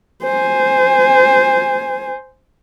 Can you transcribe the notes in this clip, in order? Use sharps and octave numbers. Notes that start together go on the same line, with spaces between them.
C5 G#5